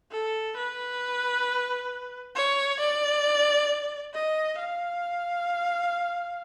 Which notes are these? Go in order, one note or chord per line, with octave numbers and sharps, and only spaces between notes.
A4
B4
C#5
D5
D#5
F5